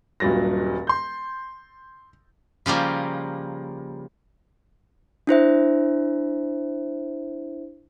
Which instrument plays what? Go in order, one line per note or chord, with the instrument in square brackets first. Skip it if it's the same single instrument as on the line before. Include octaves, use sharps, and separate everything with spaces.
[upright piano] D#1 G2 A#2 F#3 A6 A#6
C6 G6
[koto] C#3 F3 G3 A#3
[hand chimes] D4 E4 C5 E5